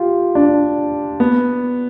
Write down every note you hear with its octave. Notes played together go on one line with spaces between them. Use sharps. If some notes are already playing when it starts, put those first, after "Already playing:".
Already playing: F4 G4
D4
B3